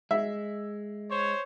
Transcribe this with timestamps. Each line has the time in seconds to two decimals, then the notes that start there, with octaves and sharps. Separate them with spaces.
0.11 G#3 E5
1.09 C5 C#5